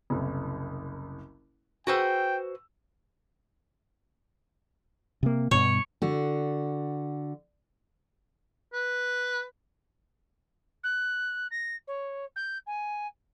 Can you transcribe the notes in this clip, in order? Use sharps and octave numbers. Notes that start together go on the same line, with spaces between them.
F#1 C2
F#4 G#4 B4 C5 G5 E6
C3 A#3
G2 B2 C#5
D3 F#4
B4
F#6
A#6
C#5
G6
G#5